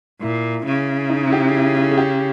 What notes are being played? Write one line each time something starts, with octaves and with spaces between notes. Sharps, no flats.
A#2 E4
C#3
D#4
E4
G4
E4
E4
G#4
G4